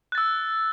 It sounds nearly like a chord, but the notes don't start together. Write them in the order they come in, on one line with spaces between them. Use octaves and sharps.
F#6 A6 E6